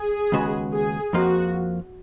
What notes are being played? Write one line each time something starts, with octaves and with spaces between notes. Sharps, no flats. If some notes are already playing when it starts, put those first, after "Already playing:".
Already playing: G#4
D#2 C#3 G#3 B3 F#4
G#4
F2 F3 A#3 F4 F#4